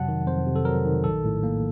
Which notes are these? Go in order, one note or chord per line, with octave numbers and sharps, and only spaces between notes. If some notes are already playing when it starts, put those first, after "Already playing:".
Already playing: F2 C3 F#3 F#5 A5
D#3
F2 C5
C3
A4
F#3 A#4
D#3
A#1 A4
A2
A#3